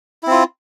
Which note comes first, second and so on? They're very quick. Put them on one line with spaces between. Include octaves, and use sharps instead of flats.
E4 C4 F4